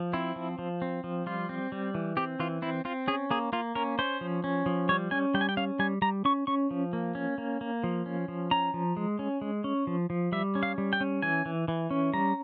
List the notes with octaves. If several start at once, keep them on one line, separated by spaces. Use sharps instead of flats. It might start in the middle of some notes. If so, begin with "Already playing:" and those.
Already playing: F3
C4 E4
F3
F3
C4
F3
G3 F4
C4
G3
E3
C4 G4
E3 F4
C4 E4
C4 F4
C#4 G#4
A#3 G#4
A#3 F4
C#4 A#4
C#4 C5
F3
C#4
F3
G3 C#5
C#4 G#5
G3 G5
G#5
G5
C#4 F5
G3 G#5
G3 A#5
C#4 C#6
C#4 C#6
F3
A#3
C#4
A#3
A#3
F3
C#4
F3
C#4 A#5
F3
G#3
C#4
G#3
C#4
F3
F3
G3 E5
C#4
F5
G3
G5
C#4
E3 G#5
E3
E3
C#4
G3 A#5